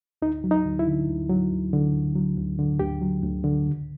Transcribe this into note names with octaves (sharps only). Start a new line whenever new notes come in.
D2 D#4
F#3
D#4
D2
E4
D3
D2
F#3
D2
D3
D2
F#3
D2
D3
D2 G4
F#3
D2
D3
C#2